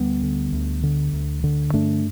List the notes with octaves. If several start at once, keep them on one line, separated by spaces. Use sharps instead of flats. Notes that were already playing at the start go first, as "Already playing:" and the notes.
Already playing: D2 G3 B3
D3
D2
D3
D2
D3
G2 A3 D4